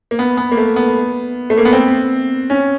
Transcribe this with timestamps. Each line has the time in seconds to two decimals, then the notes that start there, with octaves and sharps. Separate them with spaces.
0.11 A#3
0.19 B3
0.37 B3
0.52 A#3
0.57 A3
0.76 B3
1.50 A3
1.58 A#3
1.65 B3
1.73 C4
2.50 C#4